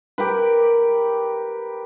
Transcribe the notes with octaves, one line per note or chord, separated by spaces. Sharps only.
G4 A#4 B4